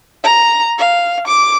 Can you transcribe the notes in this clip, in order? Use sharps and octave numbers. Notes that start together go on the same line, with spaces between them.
A#5
F5
D6